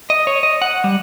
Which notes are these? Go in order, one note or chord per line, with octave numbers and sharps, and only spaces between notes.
D#5
C#5
D#5
F#5
G3